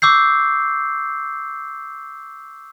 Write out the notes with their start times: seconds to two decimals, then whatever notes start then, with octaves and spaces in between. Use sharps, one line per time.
0.02 C#6 D6 E6 G6 C7